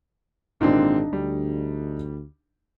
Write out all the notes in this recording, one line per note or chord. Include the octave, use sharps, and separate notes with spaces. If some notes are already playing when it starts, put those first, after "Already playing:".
G#1 A#2 D3 C4 D4 D#4
D2 G3